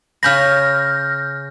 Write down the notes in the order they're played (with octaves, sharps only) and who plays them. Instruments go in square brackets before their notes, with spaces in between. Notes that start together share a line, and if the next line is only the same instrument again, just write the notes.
[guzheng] C#3 C#4 B5 [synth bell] F6 G6 A#6